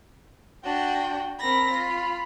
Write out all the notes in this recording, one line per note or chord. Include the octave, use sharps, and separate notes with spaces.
D4 F#4 G5
C4 A#4 B5 A#6
F4